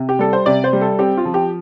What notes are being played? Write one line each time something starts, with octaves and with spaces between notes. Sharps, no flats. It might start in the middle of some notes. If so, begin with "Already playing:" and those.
Already playing: C3
G4
G3 A4
C5
C3 D5
C5
G3
A4
C4 G4
F4
F3
G4